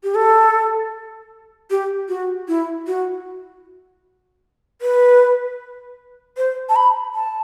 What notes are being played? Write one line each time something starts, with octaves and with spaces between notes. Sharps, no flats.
G4
A4
G4
F#4
E4
F#4
B4
C5
A5
B5
A5